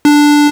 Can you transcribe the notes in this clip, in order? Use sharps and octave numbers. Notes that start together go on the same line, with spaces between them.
D4